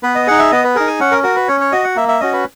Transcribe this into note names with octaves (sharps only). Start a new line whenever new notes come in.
B3 B4
D#5
D#4 G#4 F#5
E5
B3 D#5
B4
D#4 G#4 A#4
G#5
C#4 F#5
A#4
F#4 A#4
B4
C#4 C#5
C#5
F#4 D#5
F#5
A#3 E5
E5
C#4 F#4 D#5
B4